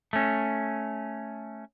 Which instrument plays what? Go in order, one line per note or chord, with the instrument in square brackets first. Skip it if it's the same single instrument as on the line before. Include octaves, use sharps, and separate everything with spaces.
[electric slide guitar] A3 C#4